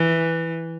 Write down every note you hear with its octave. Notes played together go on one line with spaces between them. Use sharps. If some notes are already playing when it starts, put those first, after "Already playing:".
Already playing: E3